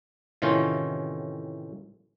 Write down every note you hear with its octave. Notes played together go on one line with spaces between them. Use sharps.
A2 C3 D#3 E3 C#4 F4